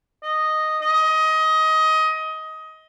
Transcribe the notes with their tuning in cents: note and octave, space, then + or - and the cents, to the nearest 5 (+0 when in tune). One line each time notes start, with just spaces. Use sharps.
D#5 -5
D#5 +20